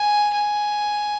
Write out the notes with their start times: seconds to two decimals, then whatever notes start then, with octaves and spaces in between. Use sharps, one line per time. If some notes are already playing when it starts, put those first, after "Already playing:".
Already playing: G#5
0.33 G#5